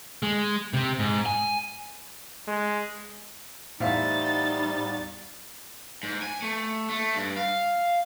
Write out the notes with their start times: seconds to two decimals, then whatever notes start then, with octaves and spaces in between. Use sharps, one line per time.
0.23 G#3
0.74 C3
0.99 G#2
1.26 G#5
2.47 G#3
3.80 E2 A2 G3 D#4 C5 E5 F5 A6
6.03 G#2
6.22 G#5
6.42 A3
6.90 A3
7.15 G2
7.37 F5